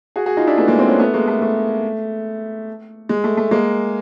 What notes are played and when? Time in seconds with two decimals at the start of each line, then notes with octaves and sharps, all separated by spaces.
0.16 F#4 G#4
0.26 F#4 G#4
0.37 D#4 F4
0.47 D4 E4
0.57 A3 B3
0.68 G#3 A#3
0.79 A#3 C4
0.89 B3 C#4
0.99 A3 B3
1.14 G#3 A#3
1.28 A3
1.42 A3
3.09 G#3
3.24 A3
3.37 A3
3.51 G#3 A#3